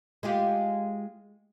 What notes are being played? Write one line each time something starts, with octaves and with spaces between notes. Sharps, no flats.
G#3 F4 G4